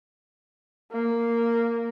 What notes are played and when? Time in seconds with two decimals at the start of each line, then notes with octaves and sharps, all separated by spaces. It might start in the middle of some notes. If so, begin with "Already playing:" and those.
0.92 A#3